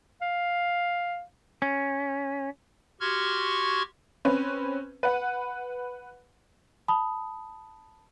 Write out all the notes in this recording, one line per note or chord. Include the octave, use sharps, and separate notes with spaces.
F5
C#4
F#4 G4 C6 C#6 F6 G#6
C4 C#4 B4
B4 F#5
A5 B5 D#6